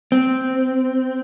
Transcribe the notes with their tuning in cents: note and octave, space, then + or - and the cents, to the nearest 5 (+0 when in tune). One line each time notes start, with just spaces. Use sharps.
C4 -10